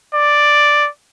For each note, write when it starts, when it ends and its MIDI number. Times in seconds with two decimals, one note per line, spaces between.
0.14 0.88 74